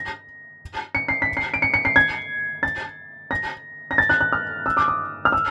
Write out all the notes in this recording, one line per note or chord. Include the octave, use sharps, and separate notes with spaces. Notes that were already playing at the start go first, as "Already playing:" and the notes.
Already playing: A#6
C#7
C7
B6
C7
D7
C#7
C#7
C7
G#6
A6
A#6
A#6
A6
F#6
F#6
F6
E6
D6
D#6
F6
E6